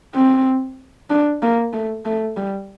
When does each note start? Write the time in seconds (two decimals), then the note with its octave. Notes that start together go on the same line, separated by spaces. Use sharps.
0.15 C4
1.10 D4
1.43 A#3
1.73 A3
2.05 A3
2.37 G3